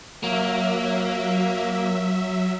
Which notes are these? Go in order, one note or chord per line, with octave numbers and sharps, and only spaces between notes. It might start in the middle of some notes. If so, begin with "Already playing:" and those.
F#3 A#3 E5